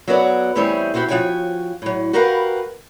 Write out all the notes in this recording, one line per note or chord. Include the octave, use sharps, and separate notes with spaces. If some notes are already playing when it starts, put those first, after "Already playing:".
F#3 B3 F#4 A4 C#5 D5
E3 G3 A3 C4 G#4 C#5
C4 E4 F#4 G4 C5
F3 G3 F#4 C#5 G5 G#5
A2 F#3
F#4 G4 A#4 B4 F5 F#5